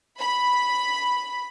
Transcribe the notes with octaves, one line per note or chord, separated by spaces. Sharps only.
B5